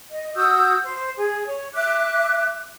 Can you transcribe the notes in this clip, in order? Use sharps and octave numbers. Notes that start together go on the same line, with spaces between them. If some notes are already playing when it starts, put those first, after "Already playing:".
D#5
F#4 D#6 E6 G6
C5
G#4
C#5
E5 D6 F#6